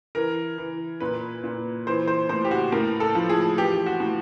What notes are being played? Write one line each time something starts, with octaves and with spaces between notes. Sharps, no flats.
E3 A#4
E3
A#2 B4
A#2
E3 C5
C5
A2 C5
G4
F#4
A2 A#4
A4
F3
G#4
E3 G4
F#4
A2